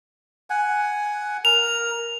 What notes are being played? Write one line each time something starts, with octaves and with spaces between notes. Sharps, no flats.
F#5 G#5
A#4 F7